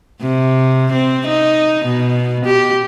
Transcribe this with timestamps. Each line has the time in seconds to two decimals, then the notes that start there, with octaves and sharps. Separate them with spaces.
0.21 C3
0.93 C4
1.27 D#4
1.85 B2
2.46 G4